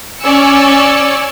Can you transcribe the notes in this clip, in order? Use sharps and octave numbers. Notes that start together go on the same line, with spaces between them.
C#4 D5 G#5 E6 C#7